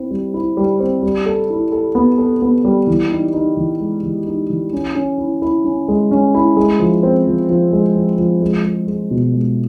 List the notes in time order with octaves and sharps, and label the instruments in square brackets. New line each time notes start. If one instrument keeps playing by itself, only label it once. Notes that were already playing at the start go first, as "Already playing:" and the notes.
Already playing: [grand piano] C4 E4
G3
E4
G3
C4
G3
A4
E4
A4
B3
A4
B3
G3
E3
D#4
D#4
E3
G#3
E3
D#4
E3
C#4
C#4
E4
E4
C#4
G#3
C#4
E4
G#3
F3
C4
F3
F3
G#3
F3
F3
G#3
G#3
G#3
B2
G#3